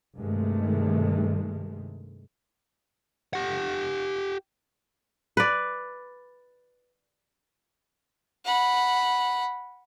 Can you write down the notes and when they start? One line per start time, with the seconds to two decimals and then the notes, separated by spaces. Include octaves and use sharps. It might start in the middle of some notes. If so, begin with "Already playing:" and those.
0.17 G2 C3 D#3 G#3 A3
3.33 G4 F#5
5.37 B4 D5
8.45 F#5 B5